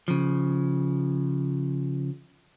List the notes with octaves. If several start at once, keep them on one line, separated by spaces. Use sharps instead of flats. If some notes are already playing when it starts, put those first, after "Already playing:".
C#3 F3